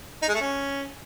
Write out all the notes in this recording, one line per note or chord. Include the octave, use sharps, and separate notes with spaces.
D#4
G#3
A3
C#4